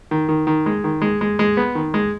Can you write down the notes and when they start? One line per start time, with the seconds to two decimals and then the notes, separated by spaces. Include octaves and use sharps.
0.11 D#3
0.29 D#3
0.47 D#3
0.66 G#3
0.84 D#3
1.02 G#3
1.21 G#3
1.39 G#3
1.57 B3
1.75 D#3
1.94 G#3